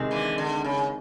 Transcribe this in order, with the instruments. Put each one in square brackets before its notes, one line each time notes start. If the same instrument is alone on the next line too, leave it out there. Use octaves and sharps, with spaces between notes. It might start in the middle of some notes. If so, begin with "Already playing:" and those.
Already playing: [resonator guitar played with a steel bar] C3 D#3 G#3
[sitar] D3 E3
D3
C#3